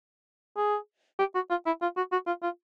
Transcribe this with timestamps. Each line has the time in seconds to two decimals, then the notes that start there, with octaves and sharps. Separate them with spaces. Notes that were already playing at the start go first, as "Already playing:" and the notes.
0.57 G#4
1.19 G4
1.35 F#4
1.50 F4
1.66 E4
1.82 F4
1.97 F#4
2.12 F#4
2.27 F4
2.43 F4